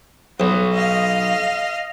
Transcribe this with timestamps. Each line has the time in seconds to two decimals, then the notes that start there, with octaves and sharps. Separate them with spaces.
0.40 B1 F#4
0.74 D#5 F5